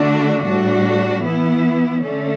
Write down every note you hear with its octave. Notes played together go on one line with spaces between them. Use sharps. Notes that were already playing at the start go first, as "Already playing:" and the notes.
Already playing: D3 A3 D4 F#4
A2 G3 D4 F#4
E3 B3 E4
D3 A3 C#4